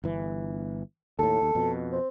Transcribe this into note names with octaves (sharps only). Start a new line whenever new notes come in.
G1 E3
D#2 A2 A4
D#2
F2 B2
C4